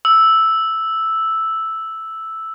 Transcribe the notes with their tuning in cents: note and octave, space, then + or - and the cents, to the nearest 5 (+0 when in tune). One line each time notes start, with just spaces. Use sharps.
E6 -5